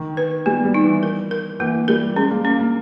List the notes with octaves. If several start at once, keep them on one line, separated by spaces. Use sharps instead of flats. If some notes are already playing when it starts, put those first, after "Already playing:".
Already playing: D#3
B4
G3 B3
G3
D#4
E3
A#4
A#4
E3 A#3
G3 A#4
G#3 C#4
A#3
A#3 C#4
A#3